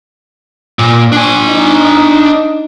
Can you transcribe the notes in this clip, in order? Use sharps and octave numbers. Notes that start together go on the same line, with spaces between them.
A#2
D4 G#5
D#4